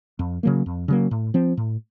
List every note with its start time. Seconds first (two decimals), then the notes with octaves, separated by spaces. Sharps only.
0.19 F2
0.43 C#3 F#3 A#3
0.66 F2
0.88 C#3 F#3 A#3
1.11 A2
1.34 F3 C4
1.57 A2